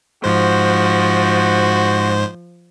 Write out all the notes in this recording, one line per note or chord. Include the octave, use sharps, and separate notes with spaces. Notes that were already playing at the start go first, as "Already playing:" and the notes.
G#2 F3 F#4 C5